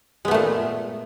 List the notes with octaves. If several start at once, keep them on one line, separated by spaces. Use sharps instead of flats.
A#2 G#3 A3 B3